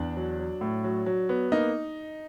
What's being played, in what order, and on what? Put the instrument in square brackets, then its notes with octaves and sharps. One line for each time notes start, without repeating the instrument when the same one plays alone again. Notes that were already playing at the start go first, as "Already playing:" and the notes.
Already playing: [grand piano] E2 [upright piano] D4
[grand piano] F#3
F#3
A2
F#3
F#3
B3
[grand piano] A#3 [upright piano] D#4